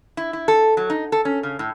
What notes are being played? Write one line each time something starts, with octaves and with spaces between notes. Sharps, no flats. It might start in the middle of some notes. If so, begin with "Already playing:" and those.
E4
E4
A4
F#3
D#4
A4
C#4
C#3
A2